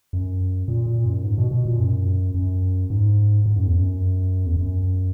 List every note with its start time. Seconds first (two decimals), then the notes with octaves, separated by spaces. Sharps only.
0.13 F#2
0.68 A#2
0.86 A#2
1.05 F#2
1.24 G#2
1.38 B2
1.51 B2
1.65 A#2
1.79 F#2
2.35 F#2
2.90 G#2
3.46 G#2
3.56 F#2
3.66 E2
3.77 F#2
4.46 E2
4.56 F#2